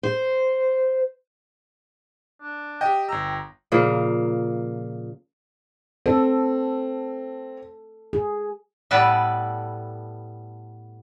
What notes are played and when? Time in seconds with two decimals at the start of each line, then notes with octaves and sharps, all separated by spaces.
0.03 C5
2.42 D4
2.81 G4 D#5 G5
3.09 G1 A#5 E6
3.72 A#2 C#3 F3 A#3
6.06 C4 A4
8.13 G#4
8.91 A2 G3 B3 A4 B4 D5